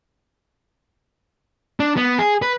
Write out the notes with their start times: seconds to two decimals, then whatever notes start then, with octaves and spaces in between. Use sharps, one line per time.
1.80 D4
1.97 B3
2.19 G#4
2.42 B4